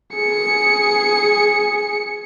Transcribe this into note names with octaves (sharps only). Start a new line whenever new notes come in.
G#4 C#7